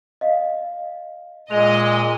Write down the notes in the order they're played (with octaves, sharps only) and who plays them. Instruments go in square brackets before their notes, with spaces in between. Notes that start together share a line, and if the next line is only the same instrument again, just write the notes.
[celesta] D#5 F5
[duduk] A#2 [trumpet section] G#3 [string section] D#5 [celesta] F7